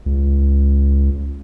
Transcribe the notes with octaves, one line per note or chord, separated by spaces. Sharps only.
C#2